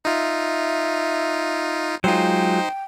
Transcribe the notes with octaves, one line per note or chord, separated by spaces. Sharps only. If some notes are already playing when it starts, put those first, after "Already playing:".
D#4 F4 E5
F#3 G#3 D#4 F4 C5 G5